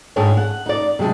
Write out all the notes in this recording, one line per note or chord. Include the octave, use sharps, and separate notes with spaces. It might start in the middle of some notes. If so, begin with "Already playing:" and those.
G#2 G#3 D4 C#5 G5
F#5
D#4 D5
C3 F#3 G#3 D4